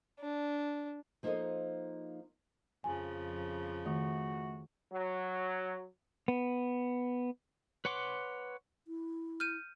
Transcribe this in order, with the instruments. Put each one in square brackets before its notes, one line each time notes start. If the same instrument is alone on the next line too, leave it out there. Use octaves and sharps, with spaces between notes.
[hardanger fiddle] D4
[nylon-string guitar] F3 A#3 D#4 A4 C5 D#5
[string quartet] F2 C#3 F3 [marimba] G#5
[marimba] D#3 [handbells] A3 [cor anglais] F#4
[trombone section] F#3
[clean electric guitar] B3
[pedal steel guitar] B4 C#5 F#5 C6 D6
[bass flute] E4
[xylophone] F6 G6 D#7